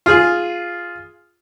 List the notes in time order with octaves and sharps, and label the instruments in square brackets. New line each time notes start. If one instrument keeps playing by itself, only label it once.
[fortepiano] F4 G#4